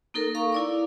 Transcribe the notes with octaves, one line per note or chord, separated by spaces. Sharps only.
A#3 D#4 A4 A#4
F5 A#5 C#6
E4 D5 D6